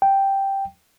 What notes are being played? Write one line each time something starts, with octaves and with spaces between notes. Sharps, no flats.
G5